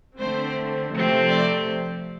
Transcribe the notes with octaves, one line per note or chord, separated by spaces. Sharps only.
D3 A3 C4 C5
C3 F3 A3 C4
D5